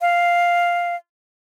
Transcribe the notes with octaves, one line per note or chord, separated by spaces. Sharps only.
F5